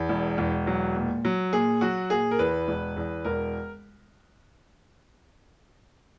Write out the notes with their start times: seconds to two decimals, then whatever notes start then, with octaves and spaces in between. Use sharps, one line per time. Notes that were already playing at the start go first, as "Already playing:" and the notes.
Already playing: E2
0.09 E1
0.38 E1
0.67 F#3
0.96 A#2
1.25 F#3
1.52 A#2 G#4
1.81 F#3 F#4
2.10 A#2 G#4
2.31 A#4
2.39 E2 B4
2.68 E1
2.97 E2
3.25 E1 A#4